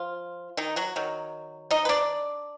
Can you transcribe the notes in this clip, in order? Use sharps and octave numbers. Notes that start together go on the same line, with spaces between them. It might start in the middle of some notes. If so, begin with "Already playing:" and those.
Already playing: F3 F4
D#3 D#4
F#3 F#4
D#3 F#3
D#4 D#5
B4
D4 D5